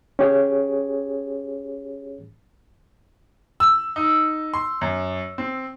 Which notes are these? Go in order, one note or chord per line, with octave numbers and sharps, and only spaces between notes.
C#4 G4 G#4 C#5
E6
D#4
C6
F#2
C4